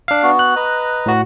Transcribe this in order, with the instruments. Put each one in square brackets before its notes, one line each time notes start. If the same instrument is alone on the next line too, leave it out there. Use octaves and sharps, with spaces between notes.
[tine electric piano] D4 F5
[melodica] B3 F#4
[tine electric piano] F#6
[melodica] B4 D#5 A#5
[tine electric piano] A2 F#4